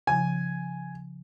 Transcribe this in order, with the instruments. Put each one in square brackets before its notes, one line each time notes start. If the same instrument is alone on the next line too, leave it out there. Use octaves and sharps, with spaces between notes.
[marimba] C#3 F3 [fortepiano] G#5